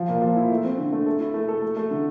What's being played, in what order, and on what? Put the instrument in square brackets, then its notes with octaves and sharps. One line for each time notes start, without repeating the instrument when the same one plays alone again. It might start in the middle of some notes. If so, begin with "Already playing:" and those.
Already playing: [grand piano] F3
A#2
F3
E4
A3
C4
D3
A3
A4
E4
A3
A4
A3
A3
D3